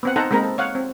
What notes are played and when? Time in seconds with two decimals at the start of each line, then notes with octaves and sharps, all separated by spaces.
0.03 B3 C4 F#5
0.16 D#4 A4 C5 F#5 A#5
0.31 G#3 A#3 C4 A#4 A#5 B5
0.44 A4
0.58 C#5 F5 F#5
0.75 C4